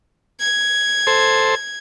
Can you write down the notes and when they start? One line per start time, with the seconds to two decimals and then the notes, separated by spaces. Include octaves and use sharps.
0.40 G#6
1.07 A4 C5